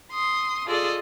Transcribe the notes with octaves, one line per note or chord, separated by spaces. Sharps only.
C6 D#6
F4 G#4 A4 D5 D#5